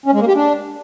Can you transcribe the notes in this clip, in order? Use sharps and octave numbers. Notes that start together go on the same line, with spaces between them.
C#4
G#3
A#3
G4
D4